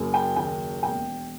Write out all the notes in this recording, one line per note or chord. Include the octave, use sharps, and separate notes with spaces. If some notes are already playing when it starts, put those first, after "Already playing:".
Already playing: F#1 F#2
G5
D#2 G5
E1 G5